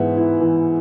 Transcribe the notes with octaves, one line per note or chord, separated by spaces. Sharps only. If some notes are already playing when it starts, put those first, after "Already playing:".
Already playing: G#2 E3 B3 E5 F#5
E4
E3